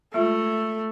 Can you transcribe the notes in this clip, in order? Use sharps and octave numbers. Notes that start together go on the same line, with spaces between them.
G#3 A3 F4 E5